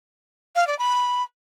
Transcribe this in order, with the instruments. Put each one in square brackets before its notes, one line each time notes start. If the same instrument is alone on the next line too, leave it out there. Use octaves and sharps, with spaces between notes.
[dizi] F5
D5
B5